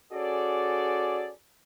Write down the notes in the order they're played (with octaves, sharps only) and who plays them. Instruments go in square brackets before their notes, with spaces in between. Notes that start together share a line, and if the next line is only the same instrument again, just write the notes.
[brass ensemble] C#4 F#4 G#4 A4 D5